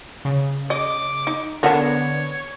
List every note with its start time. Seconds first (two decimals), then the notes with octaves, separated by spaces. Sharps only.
0.25 C#3
0.70 D#5 D6
1.27 D#4
1.63 D3 B3 D4 A#4 C#5 F#5 A5